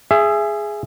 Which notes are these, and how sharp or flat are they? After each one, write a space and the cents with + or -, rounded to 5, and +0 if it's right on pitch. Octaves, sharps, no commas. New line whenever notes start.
G#4 +0 E5 +25